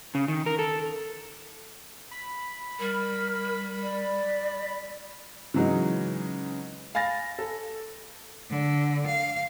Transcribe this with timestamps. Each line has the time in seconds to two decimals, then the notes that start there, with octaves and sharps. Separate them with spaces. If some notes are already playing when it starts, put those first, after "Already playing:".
0.15 C#3
0.28 D#3
0.46 A#4
0.59 A4
2.11 B5
2.80 G3 A#4
3.83 D5
5.54 C#3 E3 F#3 G#3 D#4
6.95 F5 G#5 B5 A6 A#6
7.39 A4
8.50 D3
9.06 F5